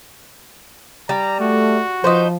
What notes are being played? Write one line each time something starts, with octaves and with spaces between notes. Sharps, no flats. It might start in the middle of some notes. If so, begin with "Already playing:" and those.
G3 A#5
A3 F#4
F3 D#4 B4 C5